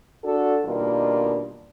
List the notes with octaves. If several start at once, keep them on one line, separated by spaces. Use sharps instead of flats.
D4 F#4 A4
B2 D#3 G3 A#3 D4 F4